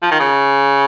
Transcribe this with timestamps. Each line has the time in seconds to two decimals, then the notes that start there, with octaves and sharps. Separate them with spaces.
0.03 F3
0.11 D#3
0.20 C#3